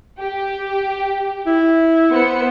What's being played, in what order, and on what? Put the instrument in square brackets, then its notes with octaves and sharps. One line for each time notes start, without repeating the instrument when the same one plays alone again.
[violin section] G4
[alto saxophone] E4
[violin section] B3 C5 C#7